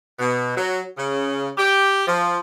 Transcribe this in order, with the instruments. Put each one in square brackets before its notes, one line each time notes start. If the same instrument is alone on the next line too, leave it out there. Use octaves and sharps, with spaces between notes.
[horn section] B2
F#3
C#3
G4
F3